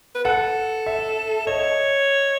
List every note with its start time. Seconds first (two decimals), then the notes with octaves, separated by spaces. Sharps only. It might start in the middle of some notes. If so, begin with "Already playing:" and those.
0.15 B4
0.24 A4 F#5
0.86 E5
1.47 C#5 D#5